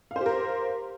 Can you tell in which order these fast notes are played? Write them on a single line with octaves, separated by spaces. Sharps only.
F5 C5 G4 A#4